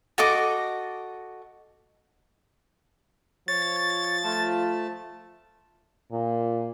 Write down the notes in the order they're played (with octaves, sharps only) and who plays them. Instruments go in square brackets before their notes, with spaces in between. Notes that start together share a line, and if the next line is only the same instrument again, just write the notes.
[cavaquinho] F#4 A4 D#5 D6
[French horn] F3 [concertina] C#5 [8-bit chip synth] A6
[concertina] A3 A5 [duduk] F4
[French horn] A#2